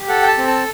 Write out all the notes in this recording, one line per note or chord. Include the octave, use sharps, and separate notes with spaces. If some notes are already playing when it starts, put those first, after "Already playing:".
Already playing: G4
A4 F#5
G5
A5
C4
A5